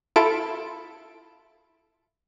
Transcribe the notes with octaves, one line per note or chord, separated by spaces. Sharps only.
E4 F4 A4 D7